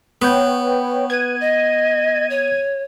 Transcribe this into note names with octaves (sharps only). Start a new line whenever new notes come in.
B3 B4 C#5 G5
B4 G#6 D#7
D#5
C#5